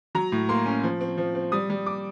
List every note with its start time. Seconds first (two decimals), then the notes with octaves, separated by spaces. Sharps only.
0.15 F#3 A#5
0.32 A2
0.49 A#3 C6
0.66 C#4
0.83 F3
1.01 C4
1.18 F3
1.35 C4
1.52 G3 D#6
1.70 G3
1.86 D6